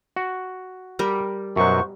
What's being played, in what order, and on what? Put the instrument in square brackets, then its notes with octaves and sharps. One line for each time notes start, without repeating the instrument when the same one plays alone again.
[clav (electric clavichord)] F#4
[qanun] G3 G4 A#4
[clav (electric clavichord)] F#2 B2 F#3 [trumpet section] C5 F#5 C#6